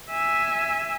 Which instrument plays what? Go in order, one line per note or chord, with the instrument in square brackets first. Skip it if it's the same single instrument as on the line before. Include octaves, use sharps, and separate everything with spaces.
[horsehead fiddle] E5 G#5